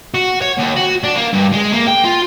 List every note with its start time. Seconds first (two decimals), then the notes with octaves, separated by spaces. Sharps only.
0.14 F#4
0.41 C#5
0.58 D#2
0.76 F#4
1.04 D4
1.16 A#3
1.33 G2
1.52 G#3
1.72 A#3
1.87 G5
2.04 F4